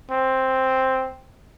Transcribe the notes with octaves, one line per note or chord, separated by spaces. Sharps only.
C4